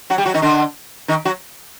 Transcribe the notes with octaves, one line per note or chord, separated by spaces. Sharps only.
F#3 F#4
G3 G4
F#3 F#4
D#3 D#4
D3 D4
D#3 D#4
F#3 F#4